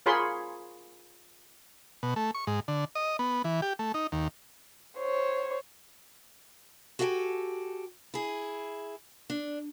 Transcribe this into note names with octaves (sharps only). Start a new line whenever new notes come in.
F4 G#4 A#4 C#5 B5 C6
B2
A3
C#6
G#2
D3
D#5
B3
E3
G4
A3
D#4
D#2
C5 C#5
F#4 G4 A4 F5 G5 G#5
E4 G#4
D4